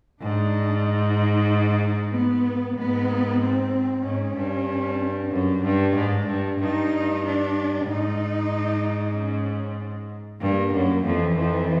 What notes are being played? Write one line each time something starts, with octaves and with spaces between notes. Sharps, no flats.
G#2 D4
D#4
B3
G#2 B3
C4
G#2 C#4
G2
F#2 D4
G2
G#2
G2
G2 D#4
D4
G#2 D#4
C#4
G2 A#3
F#2
F2 E3
F2